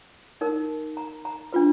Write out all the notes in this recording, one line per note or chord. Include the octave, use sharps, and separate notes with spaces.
D#4 A#4
A#5
A#5
D4 F4 B4